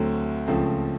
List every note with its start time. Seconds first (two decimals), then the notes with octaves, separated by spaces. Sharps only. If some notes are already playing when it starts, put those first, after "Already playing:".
Already playing: D2 D3 F#3 A3 C4
0.47 C#2 C#3 F3 A3 C4